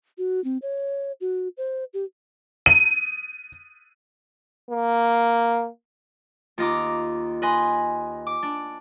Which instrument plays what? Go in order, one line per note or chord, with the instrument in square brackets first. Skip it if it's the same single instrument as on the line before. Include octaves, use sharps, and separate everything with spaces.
[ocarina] F#4
C4
C#5
F#4
C5
G4
[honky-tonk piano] D#7
[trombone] A#3
[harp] D#2 F4 D#5 A#5 D6
B4 D#5 G#5 C6
D6
D4